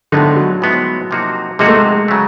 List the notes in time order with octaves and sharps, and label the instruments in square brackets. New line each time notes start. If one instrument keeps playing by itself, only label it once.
[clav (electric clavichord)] A2 F3 G#3 B3 D#4 [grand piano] D3
[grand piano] F#3
[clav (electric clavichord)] A2 F3 G#3 B3 D#4
C3 F3 A#3 D#4 F#4
[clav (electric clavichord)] C3 F3 A#3 D#4 F#4 [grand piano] G#3
[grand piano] A3
G#3
[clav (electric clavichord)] C#3 F#3 A3